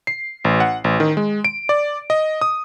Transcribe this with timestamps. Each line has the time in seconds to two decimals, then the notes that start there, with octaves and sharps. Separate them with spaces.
0.07 C7
0.45 A1
0.60 F#5
0.84 A1
1.00 D#3
1.17 G#3
1.45 D7
1.69 D5
2.10 D#5
2.41 D#6